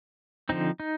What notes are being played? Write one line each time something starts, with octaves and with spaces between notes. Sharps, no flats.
D3 F3 C4 D#4
D#4